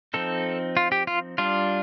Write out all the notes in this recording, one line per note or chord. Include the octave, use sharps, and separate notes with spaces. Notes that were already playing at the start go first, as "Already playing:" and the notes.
F3 C4 D#4 A4
F4
G4
F4
G3 D4 F4